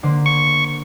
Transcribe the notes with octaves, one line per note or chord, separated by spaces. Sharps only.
D3 A#3 C5
C#6